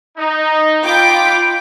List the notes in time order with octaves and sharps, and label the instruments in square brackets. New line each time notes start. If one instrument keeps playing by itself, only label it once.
[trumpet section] D#4
[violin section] F4 B5 D6 [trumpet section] G5